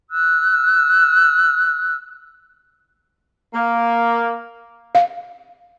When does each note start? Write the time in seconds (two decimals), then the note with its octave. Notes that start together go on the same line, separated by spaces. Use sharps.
0.10 E6 F#6
3.54 A#3
4.95 F5